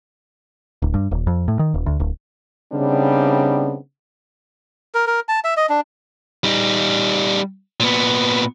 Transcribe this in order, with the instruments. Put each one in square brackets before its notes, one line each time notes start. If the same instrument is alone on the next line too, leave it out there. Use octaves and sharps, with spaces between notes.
[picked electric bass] D1
G2
D#1
F2
A2
D#3
D#1
D2
D1
[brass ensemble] C#3 G3 B3 C4 D4 D#4
[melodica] A#4
A#4
A5
E5
D#5
D4
[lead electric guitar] G3 D#4
A#2 B3